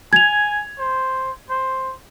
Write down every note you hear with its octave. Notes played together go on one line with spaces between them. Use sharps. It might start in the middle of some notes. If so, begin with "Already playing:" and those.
G#5 G#6 F7
C5
C5